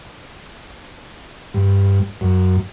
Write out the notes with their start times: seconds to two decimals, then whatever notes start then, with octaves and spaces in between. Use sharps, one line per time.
1.54 G2
2.21 F#2